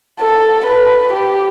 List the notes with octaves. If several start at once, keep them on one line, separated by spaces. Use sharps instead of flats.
A4
B4
G4